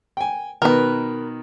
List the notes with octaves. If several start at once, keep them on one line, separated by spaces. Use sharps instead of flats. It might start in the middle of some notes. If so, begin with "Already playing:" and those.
G5 G#5
B2 D#3 A#4 B4